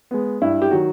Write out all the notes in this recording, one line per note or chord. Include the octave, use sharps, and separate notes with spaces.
G#3 B3
G2 E4
G4
D#3 F#3 F#4